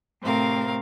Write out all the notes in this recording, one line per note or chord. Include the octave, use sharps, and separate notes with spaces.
A2 C3 A3 C4 A#4 F5